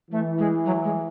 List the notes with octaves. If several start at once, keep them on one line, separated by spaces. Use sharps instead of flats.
E3 A3
G#3
F#3
G#3